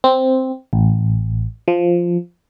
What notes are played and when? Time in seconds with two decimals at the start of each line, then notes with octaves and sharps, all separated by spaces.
0.04 C4
0.73 A1
1.68 F3